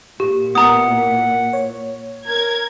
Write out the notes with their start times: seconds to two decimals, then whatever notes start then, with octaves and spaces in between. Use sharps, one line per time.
0.20 A#2 G4
0.55 B3 E4 A#4 F#5 A#5 D#6
1.53 C#5
2.26 A#4 G#6